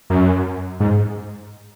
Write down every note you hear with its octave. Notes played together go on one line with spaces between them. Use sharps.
F#2
G#2